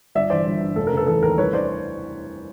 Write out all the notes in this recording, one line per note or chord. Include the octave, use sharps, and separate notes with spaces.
G1 D5 E5
E3 C5 D5
G1
G2
F1 A4
C#3 A#4
A4 B4
E3 A4
D#2 A#4
C2 B4 C#5
C5 D5